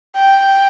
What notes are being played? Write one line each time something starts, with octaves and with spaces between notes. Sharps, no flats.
G5